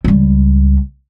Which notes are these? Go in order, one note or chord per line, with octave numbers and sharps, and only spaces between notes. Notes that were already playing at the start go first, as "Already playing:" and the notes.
C#2 G3